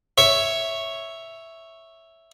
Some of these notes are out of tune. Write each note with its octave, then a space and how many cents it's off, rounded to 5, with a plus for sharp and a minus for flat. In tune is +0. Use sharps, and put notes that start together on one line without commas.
C#5 +0 E5 +0